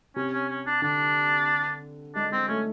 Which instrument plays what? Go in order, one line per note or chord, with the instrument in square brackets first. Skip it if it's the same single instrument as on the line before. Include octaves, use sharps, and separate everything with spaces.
[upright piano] C3 [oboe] C#4
[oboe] C#4
C#4
D4
[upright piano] D3 [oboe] D4
[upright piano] G#3 [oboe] D4
[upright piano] G#3 [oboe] C4
[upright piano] A3 [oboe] C#4